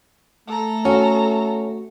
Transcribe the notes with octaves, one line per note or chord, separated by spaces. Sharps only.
A3 A4 A#5
C#4 F#4